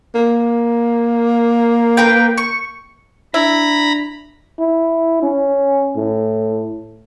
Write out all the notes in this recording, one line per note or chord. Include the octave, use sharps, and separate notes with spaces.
A#3
A#4 B4 G5
C#6
D4 E4 A#5 B5
E4
C#4
A2